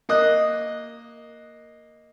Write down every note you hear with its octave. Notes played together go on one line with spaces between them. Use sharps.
A#3 D#5 D#6 F#6